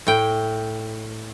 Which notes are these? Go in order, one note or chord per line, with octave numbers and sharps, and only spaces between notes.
A2 G5